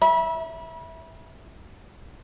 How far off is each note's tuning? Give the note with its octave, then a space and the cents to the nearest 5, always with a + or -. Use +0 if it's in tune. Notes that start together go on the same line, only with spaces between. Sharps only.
E5 -10 B5 -35